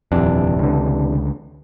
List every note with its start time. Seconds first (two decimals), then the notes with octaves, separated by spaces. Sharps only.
0.12 D#1 F2 C3 E3 D4
0.59 C#2 D3